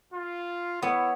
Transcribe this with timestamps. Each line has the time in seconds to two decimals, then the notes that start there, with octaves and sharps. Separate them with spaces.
0.13 F4
0.82 B3 E4 C#5